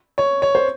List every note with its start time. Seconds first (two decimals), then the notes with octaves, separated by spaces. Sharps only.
0.18 C#5
0.42 C#5
0.55 C5